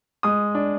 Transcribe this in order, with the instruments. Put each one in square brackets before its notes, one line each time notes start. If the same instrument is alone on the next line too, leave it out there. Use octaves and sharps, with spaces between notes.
[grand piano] G#3 D#6
D4